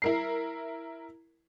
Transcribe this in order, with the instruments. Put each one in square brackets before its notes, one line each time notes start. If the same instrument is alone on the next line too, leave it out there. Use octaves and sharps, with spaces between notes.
[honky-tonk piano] E4 A#4 C7